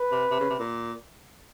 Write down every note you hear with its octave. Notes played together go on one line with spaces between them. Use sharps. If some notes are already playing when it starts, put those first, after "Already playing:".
Already playing: B4
C3
C3
C#3
C3
A#2